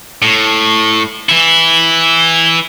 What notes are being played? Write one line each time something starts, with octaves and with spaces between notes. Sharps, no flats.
A2
E3 E4